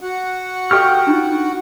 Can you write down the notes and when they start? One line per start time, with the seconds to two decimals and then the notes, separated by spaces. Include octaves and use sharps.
0.01 F#4 F#5
0.71 G4 A4 F5 G5 C#6 F6
1.07 D4 D#4 F4